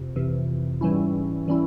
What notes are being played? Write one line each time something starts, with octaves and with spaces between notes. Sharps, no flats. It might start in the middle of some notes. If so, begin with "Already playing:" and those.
Already playing: F2 C3
F2 C3 E3
G#2 E3 G3 C#4 E4
E3 G3 C#4 E4